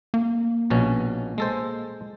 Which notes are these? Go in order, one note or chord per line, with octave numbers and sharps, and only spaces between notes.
A#3
A#1 B2 C#4
G#3 A4 C5